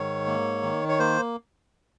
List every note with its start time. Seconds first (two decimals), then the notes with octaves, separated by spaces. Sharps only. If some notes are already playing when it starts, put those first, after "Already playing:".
Already playing: G#2 D#3 C#5
0.27 A#3
0.63 D#3
0.89 C#5
0.99 A#3 C5